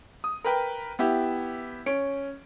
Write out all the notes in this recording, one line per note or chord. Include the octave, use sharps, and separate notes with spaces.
D#6
A#4 B4 G5
B3 E4 G4
C#4 D7